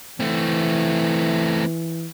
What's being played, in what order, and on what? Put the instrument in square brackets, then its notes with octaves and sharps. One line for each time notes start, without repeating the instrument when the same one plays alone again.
[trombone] E3 [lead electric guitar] A3 C4